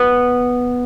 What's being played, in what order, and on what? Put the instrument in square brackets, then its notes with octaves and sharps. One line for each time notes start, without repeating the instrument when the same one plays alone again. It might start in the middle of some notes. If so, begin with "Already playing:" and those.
Already playing: [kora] B3